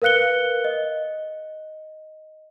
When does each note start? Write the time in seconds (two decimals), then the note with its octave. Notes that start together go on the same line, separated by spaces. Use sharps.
0.02 A#4 B4 F5 F#6 C#7 G7
0.64 D#5